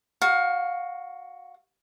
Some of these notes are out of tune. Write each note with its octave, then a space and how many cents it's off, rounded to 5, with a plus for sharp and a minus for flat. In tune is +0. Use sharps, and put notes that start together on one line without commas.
F#4 +0 F5 +20